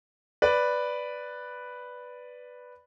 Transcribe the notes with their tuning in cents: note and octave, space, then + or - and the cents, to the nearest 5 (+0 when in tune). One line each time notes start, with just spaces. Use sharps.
B4 +0 D5 +0